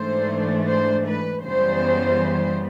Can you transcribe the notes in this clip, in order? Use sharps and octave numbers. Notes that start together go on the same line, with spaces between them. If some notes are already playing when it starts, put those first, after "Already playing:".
Already playing: G#2 E3 A3 D4 C5
C5
B4
F#2 C#3 E3 G3 B3 C5